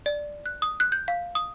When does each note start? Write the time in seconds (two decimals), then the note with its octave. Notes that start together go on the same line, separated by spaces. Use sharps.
0.06 D5
0.46 F#6
0.62 D#6
0.80 F#6
0.92 G6
1.08 F5
1.35 D#6